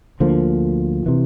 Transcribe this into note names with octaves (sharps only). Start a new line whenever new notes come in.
D2 D3 F3 A#3
C3 E3